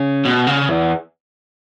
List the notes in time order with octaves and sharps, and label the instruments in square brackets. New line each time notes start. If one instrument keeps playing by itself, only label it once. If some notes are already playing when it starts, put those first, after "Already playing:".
Already playing: [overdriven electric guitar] C#3
B2
C#3
E2